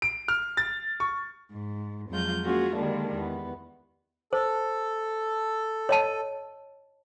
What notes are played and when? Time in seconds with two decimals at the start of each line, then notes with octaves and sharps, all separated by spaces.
0.02 D7
0.28 F6
0.57 A6
1.00 C#6
1.51 G#2
2.09 F2 F#3 G#3 F4 G6
2.44 G#3 A#3 C#4 F4 F#4 G#4
2.75 D3 D#3 G3 G#3 A#3 D4
3.14 E2 B3
4.33 A4 C5
5.89 C#5 D#5 A5